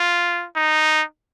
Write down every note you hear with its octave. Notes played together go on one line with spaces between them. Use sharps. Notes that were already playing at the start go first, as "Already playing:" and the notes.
Already playing: F4
D#4